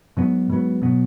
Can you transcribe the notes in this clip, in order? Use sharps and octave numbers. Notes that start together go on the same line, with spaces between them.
G#2 F#3 B3
G#2 F#3 B3
B2 F#3 B3